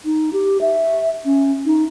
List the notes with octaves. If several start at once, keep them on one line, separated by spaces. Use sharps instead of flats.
D#4
G4
E5
C#4
D#4